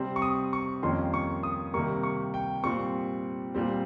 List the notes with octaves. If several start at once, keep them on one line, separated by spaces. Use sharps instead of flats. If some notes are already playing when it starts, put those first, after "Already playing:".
Already playing: C3 G3 C4
C#6
D#6
C#6
F2 D#3 G3 A#3 C#4 C6
C#6
D#6
C3 D#3 G3 A#3 C#6
C#6
G5
A#2 G3 C4 C#6
A#2 G3 C4